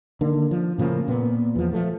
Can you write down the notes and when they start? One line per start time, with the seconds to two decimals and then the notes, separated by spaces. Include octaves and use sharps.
0.21 D3 D#3 A#3
0.51 F3
0.78 A2 C#3 F3 A#3
1.08 A#2 B3
1.56 E2 F3
1.73 F3 A3